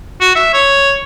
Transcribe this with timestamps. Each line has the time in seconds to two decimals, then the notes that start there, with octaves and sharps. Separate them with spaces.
0.21 F#4
0.36 E5
0.54 C#5